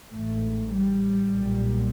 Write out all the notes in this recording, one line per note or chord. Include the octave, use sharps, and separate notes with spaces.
A1 G#2 A3
G3
B1 A#2